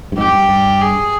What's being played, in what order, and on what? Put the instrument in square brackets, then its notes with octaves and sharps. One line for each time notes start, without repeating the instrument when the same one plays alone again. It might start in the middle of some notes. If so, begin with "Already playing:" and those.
[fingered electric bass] G2
[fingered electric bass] F2 G#2 [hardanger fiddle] G4
[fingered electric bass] G2
G2
[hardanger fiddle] G#4